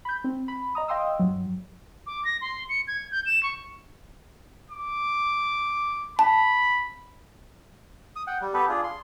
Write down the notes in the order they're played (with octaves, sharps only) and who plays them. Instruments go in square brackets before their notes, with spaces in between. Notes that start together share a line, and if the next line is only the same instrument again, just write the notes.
[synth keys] B5 G6
C4
B5
D#5 A#5 D#6
D#5 F5 G5 C6 D#6 E6
G2 F#3
[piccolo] D6
A#6
C6
C#7
G#6
G6
E7
C#6
[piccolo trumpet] D6
[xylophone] A5 [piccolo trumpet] B5
[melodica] D#6
F#5 G5
G3
B3 G4 A4 B4
D4 F4 G#4
C6